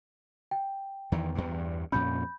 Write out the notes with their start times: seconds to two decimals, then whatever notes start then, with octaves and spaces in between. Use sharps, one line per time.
0.51 G5
1.12 E2 D#3 E3
1.35 E2 G2
1.92 F2 A#2 C#4 B5 G6